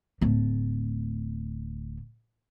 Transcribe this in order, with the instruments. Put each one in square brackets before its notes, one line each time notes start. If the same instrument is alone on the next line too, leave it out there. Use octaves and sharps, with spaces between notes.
[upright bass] D1 A3